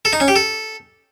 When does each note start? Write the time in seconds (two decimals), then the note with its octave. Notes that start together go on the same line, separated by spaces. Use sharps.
0.05 A4
0.13 D#4
0.20 C#4
0.28 G4
0.36 A4